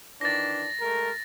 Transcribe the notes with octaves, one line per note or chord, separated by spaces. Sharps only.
D#3 E3 D4 A6 A#6
G#3 A3 A#4